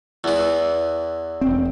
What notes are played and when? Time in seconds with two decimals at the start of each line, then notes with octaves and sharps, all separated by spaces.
0.24 E2 E3
1.41 E1 C4